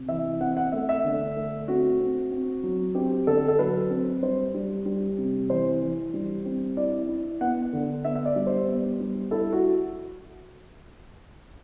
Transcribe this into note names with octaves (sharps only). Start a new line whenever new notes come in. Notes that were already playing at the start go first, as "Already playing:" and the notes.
Already playing: C3
E3 E5
C4 F#5
F#5
A3 E5
E5
D3
A3
C4 F#4
C4
C4
F#3
C4 G4
D3 A4
A4
F#3 B4
C4
G3 C5
G3
G3
C3
E3 C5
E3
G3
C4
E4 D5
E4
B3 F#5
D3
B3 E5
E5
D5
G3
C5
B3
G3
E4 A4
F#4